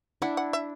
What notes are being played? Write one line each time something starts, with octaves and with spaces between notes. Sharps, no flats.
D4 E4 F#5
F#5
E5